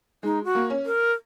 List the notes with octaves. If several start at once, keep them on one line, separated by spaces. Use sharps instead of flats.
G#3 D#4
F#4
A#3
C#4
A#4